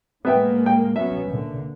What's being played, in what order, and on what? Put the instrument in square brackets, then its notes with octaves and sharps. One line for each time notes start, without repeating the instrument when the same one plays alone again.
[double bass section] A2 G#3 A#3 [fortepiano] B3 E5 G5
[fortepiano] G5
[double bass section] F#3 B3 C#4 [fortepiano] E5
[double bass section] A#2 D3